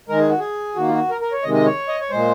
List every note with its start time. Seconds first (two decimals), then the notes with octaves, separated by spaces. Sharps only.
0.09 D#3 G#3 A#4
0.20 G#4
0.29 F#4
0.39 G#4
0.76 D#3 A#3 F#4
0.88 F4
0.93 F#4
1.10 A#4
1.21 A#4
1.32 C#5
1.43 C3 D#3 G#3 D#5
1.54 D#5
1.66 C#5
1.89 D#5
2.00 C#5
2.10 A#2 G#3 C5